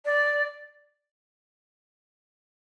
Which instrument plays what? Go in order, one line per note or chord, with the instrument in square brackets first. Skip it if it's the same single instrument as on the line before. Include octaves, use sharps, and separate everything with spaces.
[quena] D5